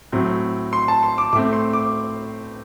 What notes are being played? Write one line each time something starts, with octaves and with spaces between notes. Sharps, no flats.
A2 F#3 C4
C6
A5
C6
D6
A2 A3 C4 D6
C6
D6